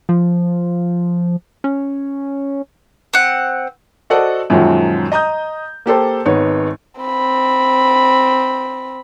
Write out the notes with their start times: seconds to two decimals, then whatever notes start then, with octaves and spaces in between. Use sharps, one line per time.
0.09 F3
1.64 C#4
3.13 C4 F#5
4.10 F#4 A4 C5 D5 D#5 F#5
4.50 F#2 A#2 D#3 F3 F#3 G#3
5.12 D#5 A#5 D#6 G6
5.86 A#3 G4 A4 C5
6.26 G#1 B3 D#4 C#5
7.01 C4 B5